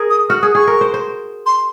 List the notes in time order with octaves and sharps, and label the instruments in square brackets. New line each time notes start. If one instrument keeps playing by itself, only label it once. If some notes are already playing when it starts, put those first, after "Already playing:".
Already playing: [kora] G#4 A#4
[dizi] D#6
[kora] F#4 [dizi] F6
[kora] G#4 [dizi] D#6
[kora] G#4 [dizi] C#6
[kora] A#4
C5
C5
[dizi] C6